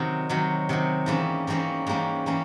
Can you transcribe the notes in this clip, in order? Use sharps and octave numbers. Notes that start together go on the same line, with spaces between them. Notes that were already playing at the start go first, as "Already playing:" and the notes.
Already playing: C3 D#3 F#3
C3 D#3 F#3
C3 D#3 F#3
G#2 E3 G3 A#3 C#4
G#2 E3 G3 A#3 C#4
G#2 E3 G3 A#3 C#4
E3 G3 A#3 C#4